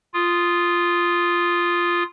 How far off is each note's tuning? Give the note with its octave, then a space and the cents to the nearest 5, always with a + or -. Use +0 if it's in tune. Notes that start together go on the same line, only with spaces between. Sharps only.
F4 -5 D#6 +0